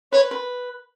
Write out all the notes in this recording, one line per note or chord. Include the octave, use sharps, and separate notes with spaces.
B4 C#5
B4